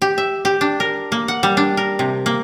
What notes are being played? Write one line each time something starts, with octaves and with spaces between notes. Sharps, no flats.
G4
E5
G4
D4
A#4
A#3
F#5
G3
D4
A#4
C3
A#3